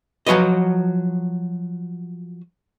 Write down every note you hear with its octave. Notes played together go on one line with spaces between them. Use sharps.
F3 F#3 F#4 B4 D#5